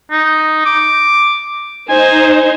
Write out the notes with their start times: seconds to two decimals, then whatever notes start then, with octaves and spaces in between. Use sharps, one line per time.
0.11 D#4
0.66 D6
1.89 D#4 C5 G#5